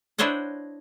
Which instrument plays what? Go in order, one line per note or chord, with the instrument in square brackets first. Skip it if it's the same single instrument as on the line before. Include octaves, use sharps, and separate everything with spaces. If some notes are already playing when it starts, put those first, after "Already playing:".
[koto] D4 E4 C5 C#5 D#5 F#5